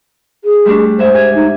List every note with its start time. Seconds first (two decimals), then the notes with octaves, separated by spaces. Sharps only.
0.45 G#4
0.65 G3 A3 D4
0.99 G#2 C5 E5
1.15 G#5
1.35 D#4